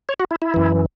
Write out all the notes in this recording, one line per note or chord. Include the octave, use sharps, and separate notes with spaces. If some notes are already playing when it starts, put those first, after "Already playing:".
C#5
F#4
E4
E4
F#2 E3